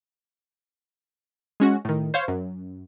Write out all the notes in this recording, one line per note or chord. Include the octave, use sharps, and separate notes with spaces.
G#3 C#4 F#4
A2 D#3
C5 C#5 F5
F#2